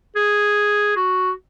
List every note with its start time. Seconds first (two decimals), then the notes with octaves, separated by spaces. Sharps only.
0.16 G#4
0.96 F#4